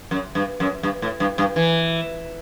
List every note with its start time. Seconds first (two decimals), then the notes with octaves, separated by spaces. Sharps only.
0.11 F#2
0.35 G2
0.60 F#2
0.83 G2
1.02 A2
1.20 G2
1.38 G2
1.56 E3